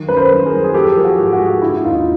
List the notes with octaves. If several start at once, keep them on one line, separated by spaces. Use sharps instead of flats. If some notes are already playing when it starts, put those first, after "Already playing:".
Already playing: D#3 F#3
F#2 B4
A#4 C5
F#2
G#4 A#4
F#3
G#4
F3 G4 A4
F3
F#4 G#4
G#2
F#4 G#4
G#2
D3 E4
D#2 D#4 F4